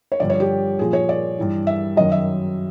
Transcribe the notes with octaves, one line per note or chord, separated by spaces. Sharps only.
C#5
G2 D3 F3 D5
C#5
G4
A#2 F3 G#4
C#5
D5
G2 E3
E5
F#2 D#3 F#3 D#5
E5